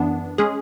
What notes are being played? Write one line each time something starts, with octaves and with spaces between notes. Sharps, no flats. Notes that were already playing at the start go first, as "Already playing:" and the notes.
Already playing: F#2 E3 B3 D4
G#3 C#4 G#4